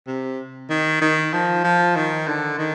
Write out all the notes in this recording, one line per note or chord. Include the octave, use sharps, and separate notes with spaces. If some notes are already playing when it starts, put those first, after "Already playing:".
C3
D#3
D#3
F3
F3
D#3
D3
D#3